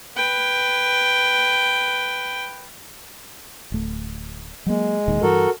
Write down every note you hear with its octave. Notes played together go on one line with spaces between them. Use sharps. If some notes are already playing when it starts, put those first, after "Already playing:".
B4 G5
D1 A3
F#3 G#3 A#3
E1 A#2 D#3
G2 E3 F#4 A4 A#4